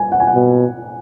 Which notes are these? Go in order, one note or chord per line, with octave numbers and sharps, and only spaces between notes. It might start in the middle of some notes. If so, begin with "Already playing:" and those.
Already playing: G#5
F#5
G#5
F#5
B2